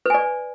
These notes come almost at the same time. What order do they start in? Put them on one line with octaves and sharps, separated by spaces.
B4 G#5 D5